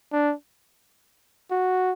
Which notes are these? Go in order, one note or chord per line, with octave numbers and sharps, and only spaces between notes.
D4
F#4